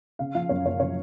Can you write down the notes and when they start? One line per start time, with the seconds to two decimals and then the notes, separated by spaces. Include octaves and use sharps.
0.19 C#3 F5
0.35 F3 F5
0.49 F#2 C#5
0.65 F#1 C#5
0.80 C#3 C#5